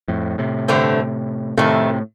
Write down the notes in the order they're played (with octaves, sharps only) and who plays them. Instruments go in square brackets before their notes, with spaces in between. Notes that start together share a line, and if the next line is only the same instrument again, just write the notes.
[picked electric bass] F2 A2
A2 C3
[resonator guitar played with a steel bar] G2 D3 A3 C4
[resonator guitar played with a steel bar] F2 D#3 A3 [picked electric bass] A2 C3